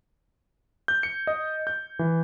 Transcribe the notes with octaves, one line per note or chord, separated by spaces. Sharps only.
G6
C#7
D#5
G6
E3